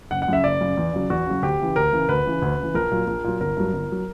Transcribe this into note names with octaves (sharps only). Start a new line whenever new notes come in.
F#1 F#5
F#5
F#2 C#3 E5
F#1 D5
F#2 C#3
E2
C#3 F#3
E2 F#4
C#3 F#3
D2 G4
C#3 E3
D2 A#4
C#3 E3
D2 B4
C#3 E3
D2
C#3 E3
A#1 A#4
A#2 F#3
A#1
A#2 F#3
G1 A#4
G2 F#3
G1
F#3